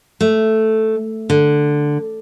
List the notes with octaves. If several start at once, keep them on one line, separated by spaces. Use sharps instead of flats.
A3
D3